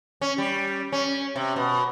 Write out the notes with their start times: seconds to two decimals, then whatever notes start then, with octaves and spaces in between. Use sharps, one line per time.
0.21 C#4
0.38 G3
0.92 C#4
1.36 C3
1.56 B2